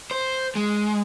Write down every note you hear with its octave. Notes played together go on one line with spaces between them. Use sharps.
C5
G#3